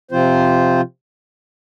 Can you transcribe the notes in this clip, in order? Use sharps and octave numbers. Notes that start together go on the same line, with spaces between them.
C3 F3 C4 F4 C5